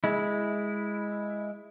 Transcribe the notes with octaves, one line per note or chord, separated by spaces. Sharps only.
G#3 E4